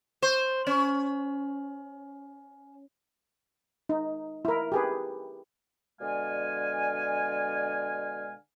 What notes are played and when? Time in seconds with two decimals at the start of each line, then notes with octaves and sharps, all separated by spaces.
0.22 C5
0.67 C#4
3.89 D#4
4.45 E4 A#4
4.72 G4 G#4 B4
6.01 B2 D3 G#3 D5 F5 G#5